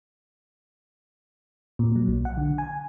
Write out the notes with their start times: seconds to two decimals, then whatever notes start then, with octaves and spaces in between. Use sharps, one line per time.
1.79 A#2
1.96 F#3
2.08 B1
2.25 F#5
2.37 D3
2.58 G#5